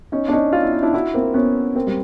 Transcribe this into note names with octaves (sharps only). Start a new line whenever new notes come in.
C#4 D#4
D4
C#4 D#4
F4
E4
D#4
D4 E4
E4 F#4
A#3 C4
B3 C#4
A#3 C4
G3